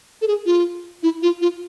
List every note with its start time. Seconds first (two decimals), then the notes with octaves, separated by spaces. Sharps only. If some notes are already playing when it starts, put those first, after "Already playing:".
0.22 A4
0.28 G#4
0.46 F4
1.03 E4
1.23 F4
1.42 F4